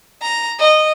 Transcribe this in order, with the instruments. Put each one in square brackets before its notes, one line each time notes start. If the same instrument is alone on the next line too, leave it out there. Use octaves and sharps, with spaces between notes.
[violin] A#5
D#5